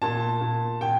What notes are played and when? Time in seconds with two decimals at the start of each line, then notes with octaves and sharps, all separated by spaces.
0.02 A#2 A5
0.41 A#2
0.81 A#2 G5